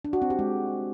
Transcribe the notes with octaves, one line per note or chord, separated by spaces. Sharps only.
D4
F#4
C4
G4
G#3